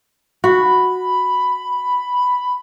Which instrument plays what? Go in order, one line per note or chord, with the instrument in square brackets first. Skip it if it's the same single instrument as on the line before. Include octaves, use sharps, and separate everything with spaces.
[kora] F#4 [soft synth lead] B5